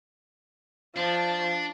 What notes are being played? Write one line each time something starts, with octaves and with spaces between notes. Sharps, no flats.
F3 D4